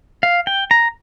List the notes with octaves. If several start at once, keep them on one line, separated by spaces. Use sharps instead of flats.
F5
G5
A#5